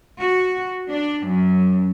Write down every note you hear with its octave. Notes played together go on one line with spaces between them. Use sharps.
F#4
D4
F#2